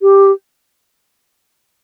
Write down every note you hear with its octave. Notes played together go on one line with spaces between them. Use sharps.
G4